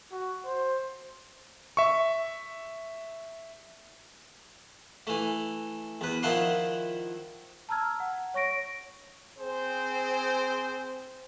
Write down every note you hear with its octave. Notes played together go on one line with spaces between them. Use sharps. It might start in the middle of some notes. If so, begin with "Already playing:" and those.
F#4
C5
E5 C#6
E3 A3
E2 B4
D#3 F3 E4 F#5 B5 C6
A5 A#5 E6 F6 G#6
F#5
C#5 C#6 A#6 D7
C4 G#4 C5